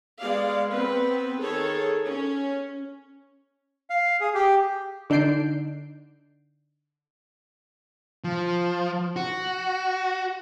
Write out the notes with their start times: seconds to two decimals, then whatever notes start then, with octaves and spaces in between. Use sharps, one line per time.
0.19 G#3 B3 D5 F5
0.69 B3 C4 B4
1.40 D#3 G#4 A4 C#5
2.05 C#4
3.90 F5
4.21 G#4
4.35 G4
5.10 D3 D4 D#4 G6 C7 D7
8.24 F3
9.16 F#4